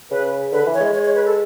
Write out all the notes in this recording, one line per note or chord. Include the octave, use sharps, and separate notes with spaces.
C#3 B4
D3 B4
E3
C#5
G#3
C#5
C#5
B4
A4